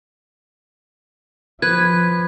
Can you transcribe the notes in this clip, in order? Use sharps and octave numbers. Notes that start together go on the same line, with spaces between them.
F3 B4 G#6